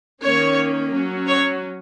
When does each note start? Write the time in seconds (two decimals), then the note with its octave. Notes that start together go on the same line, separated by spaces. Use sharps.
0.21 D#3 A#3 C#4 C#5
0.92 F#3 C#4
1.28 C#5